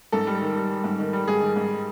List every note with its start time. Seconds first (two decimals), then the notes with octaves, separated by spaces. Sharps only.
0.12 G#2 A4
0.27 G3
0.41 D#3
0.56 G3
0.71 G3
0.84 G#2
0.99 D#3
1.13 G3
1.28 G#2 G#4
1.42 D#3
1.56 G#2